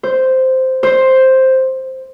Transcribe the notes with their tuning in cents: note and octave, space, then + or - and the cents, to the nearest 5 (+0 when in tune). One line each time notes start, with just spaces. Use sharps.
C5 -5
C5 +5